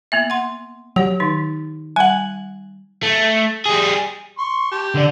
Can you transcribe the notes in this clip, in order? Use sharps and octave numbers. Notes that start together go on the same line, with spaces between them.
A#3 B3 E5
F#5 C6
F#3 G4 C#5
D#3 D#4
G3 F#5 G#5
A3
G3 G#4
C6 C#6
G4 A5
D3 D5